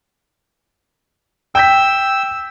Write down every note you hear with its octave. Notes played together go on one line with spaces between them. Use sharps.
G5 E6 G6 B6